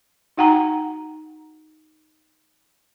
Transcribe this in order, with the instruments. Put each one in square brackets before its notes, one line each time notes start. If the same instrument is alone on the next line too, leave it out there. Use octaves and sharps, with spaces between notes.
[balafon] D#4 F#4 F#5 G5 A#5